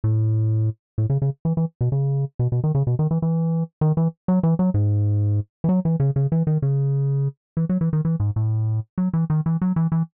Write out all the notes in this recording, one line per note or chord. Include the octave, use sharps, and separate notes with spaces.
A2
A2
C#3
C#3
E3
E3
B2
C#3
B2
B2
D#3
C#3
B2
D#3
E3
E3
D#3
E3
F#3
E3
F#3
G#2
E3
F#3
E3
C#3
C#3
E3
D#3
C#3
E3
F#3
E3
D#3
E3
G#2
A2
F#3
E3
D#3
E3
F#3
E3
E3